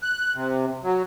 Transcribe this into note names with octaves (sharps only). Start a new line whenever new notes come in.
F#6
C3
F#3